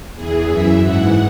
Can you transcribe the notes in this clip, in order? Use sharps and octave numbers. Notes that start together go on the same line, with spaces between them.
E2 E3 G#4
F#2 E3 E5
G#2 E3 F#5